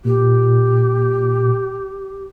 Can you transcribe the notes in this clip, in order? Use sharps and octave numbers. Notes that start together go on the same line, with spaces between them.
A#2 G4